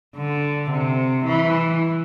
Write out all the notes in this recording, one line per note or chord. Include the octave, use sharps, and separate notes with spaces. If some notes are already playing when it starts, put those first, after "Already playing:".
D3
C3
E3